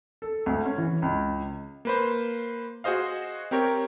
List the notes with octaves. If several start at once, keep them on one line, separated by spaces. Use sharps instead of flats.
A4
D2
C#4
E3
C#2
A#3 B4 C5
F#4 G#4 C5 D#5 F5
C4 G4 A#4 C#5